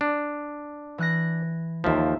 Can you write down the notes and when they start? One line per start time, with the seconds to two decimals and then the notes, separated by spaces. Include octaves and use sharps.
0.01 D4
0.98 E3 F#6 A#6
1.84 D#2 F3 A#3 E5